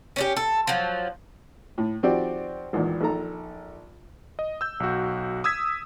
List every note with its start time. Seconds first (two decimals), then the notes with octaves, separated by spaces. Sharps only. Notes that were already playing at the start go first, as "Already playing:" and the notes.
0.16 C#4 D4 G4
0.36 A4
0.67 F3 F#3
1.78 A2
2.03 D#3 F3 C4 F#4 G4 D5
2.73 G#1 E2 A#2 D#3
3.01 A#1 D#3 A4 A#5
4.39 D#5
4.61 E6 G6
4.80 B1 F#4
5.44 D#6 E6 G#6 B6